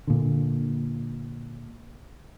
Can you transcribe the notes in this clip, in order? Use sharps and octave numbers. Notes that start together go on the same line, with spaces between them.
A#2 D3